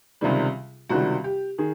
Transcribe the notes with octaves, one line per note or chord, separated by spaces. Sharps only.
C#2 C3 D#3 G3
C#2 C3 D#3 G3 F#4
G4
D#3 G#4